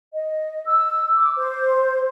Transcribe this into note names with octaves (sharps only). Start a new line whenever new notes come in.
D#5
E6
D6
C5